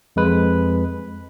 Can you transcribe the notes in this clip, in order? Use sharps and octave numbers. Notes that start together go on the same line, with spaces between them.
F2 G#3 B4